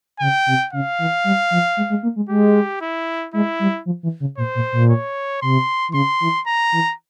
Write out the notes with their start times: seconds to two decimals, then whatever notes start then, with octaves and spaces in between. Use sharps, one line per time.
0.20 C#3 G5
0.46 C3
0.73 C#3 F5
0.99 E3
1.24 G3
1.51 F3
1.77 G#3
1.90 G#3
2.03 A#3
2.16 G#3
2.29 G#3 G4
2.81 E4
3.33 G#3 E4
3.59 G3
3.86 F3
4.03 E3
4.20 C#3
4.37 A#2 C5
4.55 A#2
4.72 A#2
4.90 C#5
5.42 C3 C6
5.89 E3
5.94 C#3 C6
6.20 E3
6.47 A#5
6.72 E3